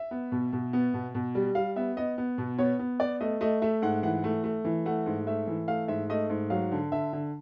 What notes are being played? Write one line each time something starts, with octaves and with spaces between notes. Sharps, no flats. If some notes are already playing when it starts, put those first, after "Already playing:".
Already playing: E5
B3
B2
B2
B3
B2
B2
G3
G3 F5
B3 E5
B3 D#5
B3
B2
B3 C#5
B3
B3 D5
A3 D#5
A3 D#5
A3 E5
G#2 F#5
E3 F#5
A3
A3
E3
A3 F#5
G#2
A3 E5
E3
A3 F5
G#2 E5
A3 D#5
G#2
F#3 F5
D3
D3 E5
D3